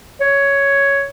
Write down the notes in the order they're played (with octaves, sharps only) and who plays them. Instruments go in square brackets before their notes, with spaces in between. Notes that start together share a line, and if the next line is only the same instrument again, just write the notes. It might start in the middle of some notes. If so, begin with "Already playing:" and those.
[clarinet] C#5